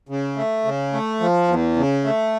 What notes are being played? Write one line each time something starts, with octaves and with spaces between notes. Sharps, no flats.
C#3
A3
C#3
A3
F3
E2
C#3
A3